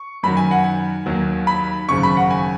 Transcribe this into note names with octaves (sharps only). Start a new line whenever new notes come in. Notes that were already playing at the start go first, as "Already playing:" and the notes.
Already playing: C#6
F#2 D#3 F#3 B5
G#5
F#5
G#5
D#2 D#3 F#3
B5
G#1 F#2 C#3 C#6
B5
F#5
G#5